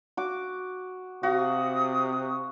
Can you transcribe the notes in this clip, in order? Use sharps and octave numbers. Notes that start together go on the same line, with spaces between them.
F#4 D6
C3 F#4 F5 D#6